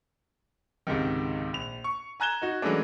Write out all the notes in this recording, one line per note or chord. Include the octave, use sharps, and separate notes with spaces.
C#2 G#2 C3 D#3
A#1 F7
C#6
G#5 A#5 F#6 G#6 E7 G7
D#4 F#4
E3 F#3 G#3 A3 C#4 D4